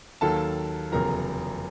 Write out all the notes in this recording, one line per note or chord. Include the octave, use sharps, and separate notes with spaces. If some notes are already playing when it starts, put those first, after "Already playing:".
D#2 D#3 F#3 A#3 A4 A5
F1 E2 C#3 F#3 A#4 A#5